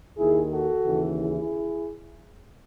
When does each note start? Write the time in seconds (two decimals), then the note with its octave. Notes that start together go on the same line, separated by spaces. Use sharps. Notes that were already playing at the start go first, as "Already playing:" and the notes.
0.18 D#2 D#3 E4 G#4
0.53 F#4 A4
0.86 D#2 C#3 E3
1.20 E4 G#4